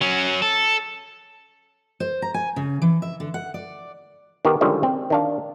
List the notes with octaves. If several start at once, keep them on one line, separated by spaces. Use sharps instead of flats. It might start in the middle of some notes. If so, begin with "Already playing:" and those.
F#3 C#4
A4
C5
A#5
G#5
C#3
E3
E5
D3
F#5
D5
D#3 B3 G4 A#4
D3 D#3 F3 G3 G#3 C#4
C4
D#3 D4 F5